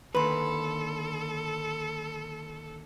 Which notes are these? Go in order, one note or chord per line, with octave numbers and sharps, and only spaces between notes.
D3 D#3 A#3 A4 B4 B5 C6